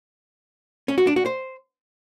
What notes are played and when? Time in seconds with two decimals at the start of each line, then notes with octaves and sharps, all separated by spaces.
0.88 C#4
0.98 F#4
1.07 D4
1.16 F#4
1.26 C5